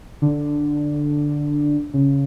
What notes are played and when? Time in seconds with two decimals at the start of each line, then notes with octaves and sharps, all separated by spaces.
0.22 D3
1.94 C#3